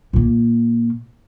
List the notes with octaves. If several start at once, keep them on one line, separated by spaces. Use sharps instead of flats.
A#2 A#3